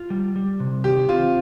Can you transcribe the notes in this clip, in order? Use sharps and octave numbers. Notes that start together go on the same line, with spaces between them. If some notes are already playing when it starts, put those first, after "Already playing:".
Already playing: F4
G3
G3
C3
D#3 G4
C4 F4